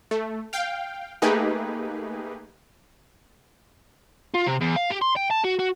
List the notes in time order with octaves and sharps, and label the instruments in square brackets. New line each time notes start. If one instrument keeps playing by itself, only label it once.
[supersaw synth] A3
F5 G5
A3 A#3 D#4 G4 G#4 B4
[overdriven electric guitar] F4
C3
E2
F5
G4
C6
G5
A5
F#4
F#4